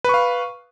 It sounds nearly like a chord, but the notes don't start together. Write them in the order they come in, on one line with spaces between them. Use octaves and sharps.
B4 C#6 F5